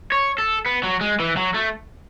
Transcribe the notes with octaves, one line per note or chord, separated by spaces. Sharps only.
C#5
A4
B3
F#3
G#3
E3
F#3
A3